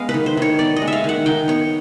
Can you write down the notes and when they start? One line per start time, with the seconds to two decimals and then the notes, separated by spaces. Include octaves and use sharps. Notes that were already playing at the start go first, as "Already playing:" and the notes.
Already playing: G#3 B3 F5
0.09 B4
0.14 D#3
0.26 C5
0.37 D#3 C#5
0.59 B3 D5
0.76 D#5
0.82 G#3
0.88 E5
0.93 F5
1.04 D#3 F#5
1.26 D#3 G5
1.48 B3 C#5